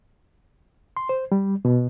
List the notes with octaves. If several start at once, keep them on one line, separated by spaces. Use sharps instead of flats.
C6
C5
G3
B2